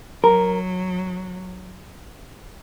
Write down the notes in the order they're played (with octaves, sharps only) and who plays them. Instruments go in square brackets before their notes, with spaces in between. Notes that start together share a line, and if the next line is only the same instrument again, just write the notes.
[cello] F#3 [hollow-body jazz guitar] A#4